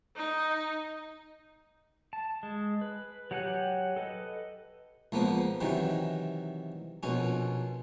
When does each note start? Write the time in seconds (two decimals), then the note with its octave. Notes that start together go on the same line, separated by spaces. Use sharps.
0.16 D#4
2.13 A5
2.43 G#3
2.81 B4
3.31 F#3 G4 F#5 G#5 F#6
3.96 A4 B4 D#5
5.12 C#2 F3 A#3 B3
5.60 C3 D#3 E3 F#3
7.03 A#1 B2 C#4